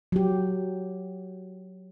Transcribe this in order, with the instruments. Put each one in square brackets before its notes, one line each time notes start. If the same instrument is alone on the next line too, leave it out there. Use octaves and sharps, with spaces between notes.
[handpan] F#3 G4